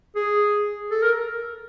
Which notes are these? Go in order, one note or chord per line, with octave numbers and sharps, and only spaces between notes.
G#4
A4
A#4